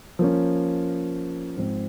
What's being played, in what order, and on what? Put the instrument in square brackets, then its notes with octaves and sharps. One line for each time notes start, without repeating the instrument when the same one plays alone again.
[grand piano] F3 A#3 C#4
G#2 F3 C4